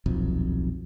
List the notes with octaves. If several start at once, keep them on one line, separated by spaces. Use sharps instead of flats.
D#1 B1 F2